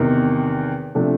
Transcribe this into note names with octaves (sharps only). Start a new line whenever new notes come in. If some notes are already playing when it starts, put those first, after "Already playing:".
Already playing: E2 C3 D#3
C3 F3 A3 D4